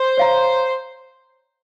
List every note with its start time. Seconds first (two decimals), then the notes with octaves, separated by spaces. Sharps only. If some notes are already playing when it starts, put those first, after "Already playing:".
Already playing: C5
0.18 C#5 F5 A#5